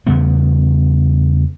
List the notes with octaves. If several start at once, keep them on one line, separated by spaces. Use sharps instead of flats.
E2 C#3 G3 B3